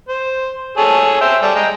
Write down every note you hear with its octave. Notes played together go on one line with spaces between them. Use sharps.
C5
G#4 A4 C#5
C5 E5 G5
G3 A4
G#3 G5 A#5